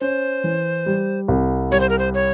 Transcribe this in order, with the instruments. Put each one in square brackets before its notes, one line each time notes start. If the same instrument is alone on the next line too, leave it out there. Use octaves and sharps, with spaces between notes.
[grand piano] C#4 [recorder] C5
[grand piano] E3
G3
C2
[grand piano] G3 [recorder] C#5
[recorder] C5
A#4
C5
C#5